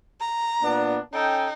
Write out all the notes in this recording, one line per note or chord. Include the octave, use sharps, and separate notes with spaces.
A#5
A#2 B3 D4
C#4 D#4 A4 G5